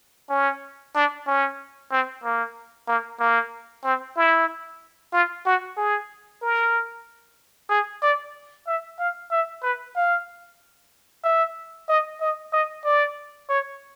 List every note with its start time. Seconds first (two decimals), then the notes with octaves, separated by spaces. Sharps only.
0.30 C#4
0.95 D4
1.27 C#4
1.92 C4
2.24 A#3
2.88 A#3
3.20 A#3
3.84 C4
4.17 E4
5.13 F4
5.46 F#4
5.77 G#4
6.42 A#4
7.70 G#4
8.02 D5
8.67 E5
8.99 F5
9.32 E5
9.63 B4
9.96 F5
11.24 E5
11.89 D#5
12.21 D#5
12.53 D#5
12.85 D5
13.50 C#5